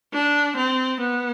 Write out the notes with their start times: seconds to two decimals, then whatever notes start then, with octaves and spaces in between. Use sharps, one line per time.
0.13 D4
0.57 C4
1.01 B3